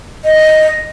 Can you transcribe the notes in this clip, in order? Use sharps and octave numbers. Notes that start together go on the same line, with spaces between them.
D#5